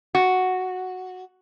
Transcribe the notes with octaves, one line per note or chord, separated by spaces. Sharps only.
F#4